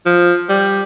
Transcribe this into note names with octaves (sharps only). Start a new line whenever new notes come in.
F3
G3